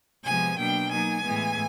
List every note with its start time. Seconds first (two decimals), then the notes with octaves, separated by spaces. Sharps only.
0.25 C3 F3 G#3 B3 G#5
0.58 B2 F#3 A#3 D4 G5
0.91 F#3 A#3 D#4 G#5
1.25 A2 E3 G#3 B3